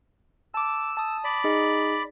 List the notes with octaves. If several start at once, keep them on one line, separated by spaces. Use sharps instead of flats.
A5 D6 E6
A5 D#6
D5 B5
D#4 G#4 D#5